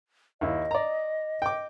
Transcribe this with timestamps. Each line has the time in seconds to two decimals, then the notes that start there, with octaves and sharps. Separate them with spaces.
0.41 D#2 E4 D#5
0.71 D5 A#5
1.42 G5 D6